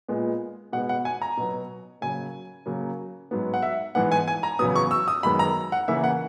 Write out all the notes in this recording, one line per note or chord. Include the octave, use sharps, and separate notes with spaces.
A#2 G#3 B3
B2 G#3 B3 F#5
F#5
G#5
A#5
B2 F#3 B3
C#3 F#3 A#3 G#5
C#3 F#3 A#3
G#2 F#3 B3
F#5
E5
G#2 E3 B3 F#5
G#5
G#5
A#5
E2 C#3 F#3 B3 D#6
C#6
E6
D#6
F#2 D#3 G#3 B3 B5
A#5
F#5
C#3 E3 A#3 E5
F#5